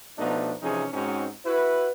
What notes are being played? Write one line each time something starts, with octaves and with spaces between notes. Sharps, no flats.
B2 F3 A3 B3 D4 D#4
C3 E3 F3 C#4 D#4 G#4
G#2 G#3 C4 C#4 D#4 F#4
E4 F#4 B4